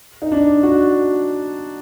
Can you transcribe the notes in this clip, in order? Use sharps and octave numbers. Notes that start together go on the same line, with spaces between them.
D#4
D4
F#4